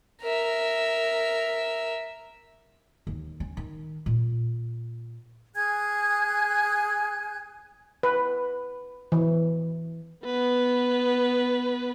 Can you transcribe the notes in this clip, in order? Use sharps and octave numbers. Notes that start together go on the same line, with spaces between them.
A#4 E5
D#2
C#4
D#3
A#2
G#4 G#5 F#6 G#6
B4
E3
B3 B4